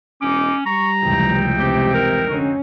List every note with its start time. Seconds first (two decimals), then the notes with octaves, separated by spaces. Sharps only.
0.22 E1 C#4 D#4 D6
0.66 G3 A#5 C#6
1.02 F1 C#2 E3 D#4 E4 G5
1.59 C3 G4
1.94 A#4
2.29 D3 C4 C#4 D#4 F#4